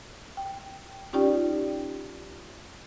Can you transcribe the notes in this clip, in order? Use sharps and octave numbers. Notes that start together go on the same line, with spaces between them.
G5
C#4 D#4 F4 G4 D5 G5